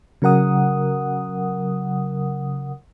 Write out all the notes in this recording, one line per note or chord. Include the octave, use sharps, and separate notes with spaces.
C#3 F#3 A#4 F#5 D#6